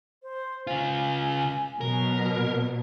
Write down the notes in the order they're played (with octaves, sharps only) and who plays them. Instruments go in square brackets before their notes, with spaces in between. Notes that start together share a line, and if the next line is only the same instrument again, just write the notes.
[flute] C5
[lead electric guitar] C#3 F4 [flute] G#5
[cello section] B2 F#3 [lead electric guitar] A#4